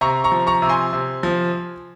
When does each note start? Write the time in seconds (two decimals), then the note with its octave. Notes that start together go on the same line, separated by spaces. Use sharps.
0.01 C3 A#5 C#6
0.24 A#5 C#6
0.32 F3
0.47 A#5 C#6
0.62 C3
0.69 G#5 C6
0.93 C3
1.23 F3